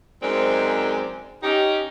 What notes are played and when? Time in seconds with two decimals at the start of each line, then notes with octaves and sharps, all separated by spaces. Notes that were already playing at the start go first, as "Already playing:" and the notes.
0.22 F#2 G#3 C4 D#4 C5 D5
1.43 C#4 D#4 G4